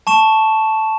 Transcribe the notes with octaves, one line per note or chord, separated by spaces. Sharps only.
A5 C#6 E7